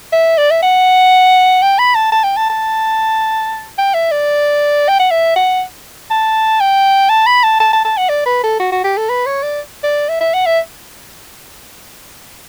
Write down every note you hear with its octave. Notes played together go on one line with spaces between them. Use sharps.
E5
D5
E5
F#5
G5
B5
A5
A5
G5
A5
A5
G5
E5
D5
G5
F#5
E5
F#5
A5
G5
A5
B5
A5
A5
A5
A5
F#5
D5
B4
A4
F#4
F#4
G4
A4
B4
C#5
D5
D5
E5
E5
F#5
E5